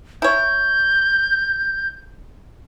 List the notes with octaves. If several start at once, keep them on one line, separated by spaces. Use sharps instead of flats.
E4 C#5 G6